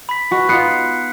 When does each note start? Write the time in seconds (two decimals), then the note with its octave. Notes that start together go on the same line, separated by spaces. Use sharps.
0.09 B5 B6
0.31 G#3 F#4 B4
0.49 B3 D#4 F4 F#6 C7 C#7